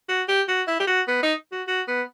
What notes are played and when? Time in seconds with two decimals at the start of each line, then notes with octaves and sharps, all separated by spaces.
0.09 F#4
0.28 G4
0.48 F#4
0.68 E4
0.80 G4
0.87 F#4
1.08 B3
1.23 D#4
1.52 F#4
1.68 F#4
1.88 B3